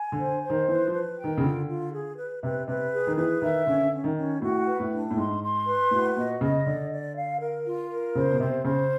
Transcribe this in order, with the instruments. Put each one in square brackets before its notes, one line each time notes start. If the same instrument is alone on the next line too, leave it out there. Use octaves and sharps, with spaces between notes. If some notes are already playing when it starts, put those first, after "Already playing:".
Already playing: [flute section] G#5
[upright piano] D3
[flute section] C5
C5
[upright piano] D#3
[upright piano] E3 [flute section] B4
[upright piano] F3
[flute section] B4
G5
[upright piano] D#3
C#3
[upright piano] D3 [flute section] F4
[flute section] F4
G#4
B4
[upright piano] C3 [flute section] B4
[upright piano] C3 [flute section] B4
[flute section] G#4
[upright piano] D#3
[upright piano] E3 [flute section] B4
[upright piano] D#3 [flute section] E5
[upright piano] D3 [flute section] C#4
[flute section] C#4
[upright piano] D#3
[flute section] C#4
[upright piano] A2 [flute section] F#4
[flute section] B4
[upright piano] A2
[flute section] D4
[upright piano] A2
[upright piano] G#2 [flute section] C6
[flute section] C6
B4
[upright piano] A2 [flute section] F#4
[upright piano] A#2 [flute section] D#5
[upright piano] C#3 [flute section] D#5
[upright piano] D3 [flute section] D5
[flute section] D5
F5
A#4
F4
A#4
[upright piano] C#3 [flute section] C5
[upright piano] B2
[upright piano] C3 [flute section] C5
[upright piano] C#3 [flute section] C5